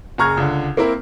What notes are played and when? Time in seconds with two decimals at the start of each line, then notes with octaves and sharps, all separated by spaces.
0.18 F#1 G#4 A#5 C#6 F6 G#6
0.37 C#2 D3
0.77 A#3 C4 E4 A#4